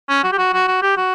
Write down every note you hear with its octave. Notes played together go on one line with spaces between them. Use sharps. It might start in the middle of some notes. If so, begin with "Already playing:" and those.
C#4
F#4
G4
F#4
F#4
F#4
G4
F#4